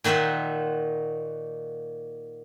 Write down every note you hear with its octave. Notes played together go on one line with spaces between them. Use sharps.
A#2 D#3 F#4 C5 E5